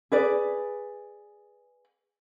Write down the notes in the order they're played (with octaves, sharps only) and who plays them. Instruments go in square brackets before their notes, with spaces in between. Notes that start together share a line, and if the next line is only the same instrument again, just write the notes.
[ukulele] G#4 B4 D5